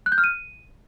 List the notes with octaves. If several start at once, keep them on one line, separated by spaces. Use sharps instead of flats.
F#6
G6
F6
D#7